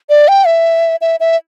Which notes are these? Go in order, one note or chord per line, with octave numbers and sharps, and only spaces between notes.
D5
G5
E5
E5
E5